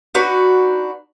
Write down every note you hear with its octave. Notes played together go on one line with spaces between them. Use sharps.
D4 D#4 F#4 B4